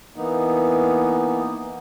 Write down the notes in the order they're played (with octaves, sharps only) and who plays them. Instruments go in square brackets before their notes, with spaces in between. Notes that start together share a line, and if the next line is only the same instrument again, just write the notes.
[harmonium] E3 A#3 B3 D#4